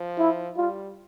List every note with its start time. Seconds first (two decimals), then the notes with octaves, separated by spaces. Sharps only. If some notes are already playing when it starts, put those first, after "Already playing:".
Already playing: F3
0.18 E4
0.57 G3 F4